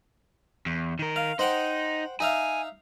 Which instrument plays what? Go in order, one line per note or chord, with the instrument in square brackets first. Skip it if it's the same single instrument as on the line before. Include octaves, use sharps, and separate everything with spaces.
[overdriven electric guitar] E2
D#3 A#4
[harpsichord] F5
[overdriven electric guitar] D#4 [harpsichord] C5 F#5 G5
[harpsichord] D#4 E5 F5 [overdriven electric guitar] G#5